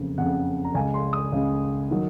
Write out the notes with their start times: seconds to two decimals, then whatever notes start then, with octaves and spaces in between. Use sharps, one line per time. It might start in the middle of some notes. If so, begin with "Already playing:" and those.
Already playing: F#1 F2 C#3
0.18 F#1 F2 C#3 F#5
0.64 A#5
0.74 C#2 C#3 G#3 G#5
0.94 C6
1.13 D#6
1.32 C#2 C#3 G#3
1.91 D#3 F#3